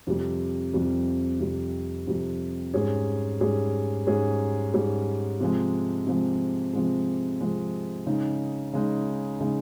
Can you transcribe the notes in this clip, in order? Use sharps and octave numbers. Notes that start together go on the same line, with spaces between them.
F2 C3 G3
F2 C3 G3
F2 C3 G3
F2 C3 G3
G#2 G3 C#4 G#4
G#2 G3 C#4 G#4
G#2 G3 C#4 G#4
G#2 G3 C#4 G#4
C3 F3 G#3
C3 F3 G#3
C3 F3 G#3
C3 F3 G#3
C#3 G#3 D#4
C#3 G#3 D#4
C#3 G#3 D#4